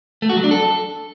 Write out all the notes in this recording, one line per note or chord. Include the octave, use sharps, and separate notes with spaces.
A3
F#4
F#3
D4
A4